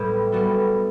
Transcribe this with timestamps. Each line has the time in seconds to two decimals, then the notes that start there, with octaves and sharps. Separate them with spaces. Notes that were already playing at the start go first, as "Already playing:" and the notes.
Already playing: A2 G3 A3 B3 E4 G4
0.32 G3 B3 F#4 A4